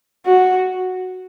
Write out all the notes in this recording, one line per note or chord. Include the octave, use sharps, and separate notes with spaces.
F#4